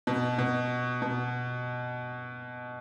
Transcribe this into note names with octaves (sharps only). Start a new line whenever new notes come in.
B2
B2
B2